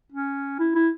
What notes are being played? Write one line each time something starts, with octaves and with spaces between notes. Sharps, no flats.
C#4
E4
E4